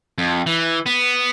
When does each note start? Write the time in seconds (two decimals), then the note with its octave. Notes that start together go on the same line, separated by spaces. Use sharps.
0.18 F2
0.47 E3
0.86 B3